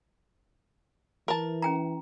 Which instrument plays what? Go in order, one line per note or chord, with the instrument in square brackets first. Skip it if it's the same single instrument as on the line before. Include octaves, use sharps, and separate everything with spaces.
[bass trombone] E3 [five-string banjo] A#4 A5
[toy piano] C#4 G5 A#5